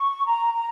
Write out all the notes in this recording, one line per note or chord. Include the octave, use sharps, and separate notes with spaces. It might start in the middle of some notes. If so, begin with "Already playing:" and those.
Already playing: C#6
A#5
A#5